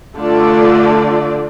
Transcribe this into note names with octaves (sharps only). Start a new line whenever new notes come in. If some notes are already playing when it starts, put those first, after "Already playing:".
D3 A3 F4 A4 D5